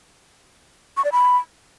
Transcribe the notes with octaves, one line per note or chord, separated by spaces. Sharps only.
C#6
D5
B5